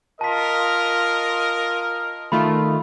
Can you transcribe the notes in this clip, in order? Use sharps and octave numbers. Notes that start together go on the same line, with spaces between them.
F4 A#4 D#5 A5 B6
D#3 A3 F4 B5